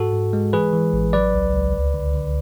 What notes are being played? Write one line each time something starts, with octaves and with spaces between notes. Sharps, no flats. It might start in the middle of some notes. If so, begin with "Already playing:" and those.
Already playing: G#2 F#4 A4
G#2
G#3
E3 G#4 B4
E3
A1
F#3 B4 D5
C#2
C#2
D2
D3
D3